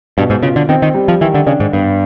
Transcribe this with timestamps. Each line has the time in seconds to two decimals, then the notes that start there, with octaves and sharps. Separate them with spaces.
0.18 G2 B2
0.30 G#2
0.43 C#3 F4
0.56 D3
0.69 D#3 C4
0.82 D#3
0.94 G3
1.08 F3
1.21 D#3 E3
1.34 D3
1.47 C#3 D4
1.60 G#2
1.72 G2 B3